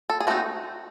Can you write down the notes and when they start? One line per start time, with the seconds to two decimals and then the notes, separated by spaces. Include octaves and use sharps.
0.10 A4
0.20 G#4
0.27 A3 C4 D#4 F#4